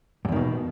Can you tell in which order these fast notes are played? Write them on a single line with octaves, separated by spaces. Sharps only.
G2 E2 D#3 B2